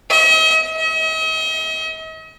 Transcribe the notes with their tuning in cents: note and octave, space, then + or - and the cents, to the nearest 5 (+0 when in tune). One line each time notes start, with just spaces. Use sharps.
D#5 +45
D#5 +45